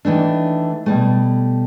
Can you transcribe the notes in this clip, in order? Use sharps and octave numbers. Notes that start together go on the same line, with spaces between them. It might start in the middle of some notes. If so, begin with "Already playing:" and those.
D#3 E3 A3 D4
B2 G3 A3